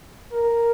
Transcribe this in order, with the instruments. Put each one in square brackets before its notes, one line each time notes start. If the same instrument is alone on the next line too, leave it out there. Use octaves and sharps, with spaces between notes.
[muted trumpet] A#4